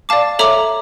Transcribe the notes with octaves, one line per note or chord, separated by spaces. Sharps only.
D5 F5 A5 D6
A4 C#5 E5 A#5 D6